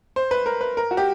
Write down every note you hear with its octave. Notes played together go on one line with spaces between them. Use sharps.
C5
B4
A#4
B4
A#4
F#4
G4